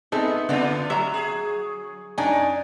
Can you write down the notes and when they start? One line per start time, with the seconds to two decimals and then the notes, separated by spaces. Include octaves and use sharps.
0.12 B3 C4 D#4 G#4 A4 E5 A5
0.49 A2 D3 B3 C4 D4 F4
0.90 F#3 E5 A#5
1.14 G#4
2.18 F#2 D4 D#4 C#5 G#5